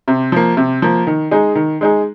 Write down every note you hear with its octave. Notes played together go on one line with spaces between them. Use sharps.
C3
F3 A#3
C3
F3 A#3
D#3
G#3 D#4 G#4
D#3
G#3 D#4 G#4